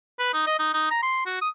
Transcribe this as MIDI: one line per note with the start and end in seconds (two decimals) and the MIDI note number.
0.19 0.30 71
0.33 0.44 63
0.47 0.55 75
0.59 0.72 63
0.74 0.85 63
0.91 0.98 82
1.02 1.21 84
1.26 1.38 66
1.41 1.49 87